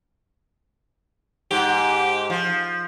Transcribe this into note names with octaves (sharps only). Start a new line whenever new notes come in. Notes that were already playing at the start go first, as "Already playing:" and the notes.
G#2 G4
F3